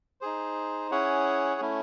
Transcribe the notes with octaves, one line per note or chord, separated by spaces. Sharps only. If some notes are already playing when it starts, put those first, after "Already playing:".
D#4 G#4 C5
C#4 E4 G#4 C#5 F#5
A3 C#4 E4